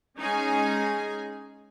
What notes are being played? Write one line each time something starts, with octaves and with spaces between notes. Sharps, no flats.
G#3 C#4 D#4 G#4 G#5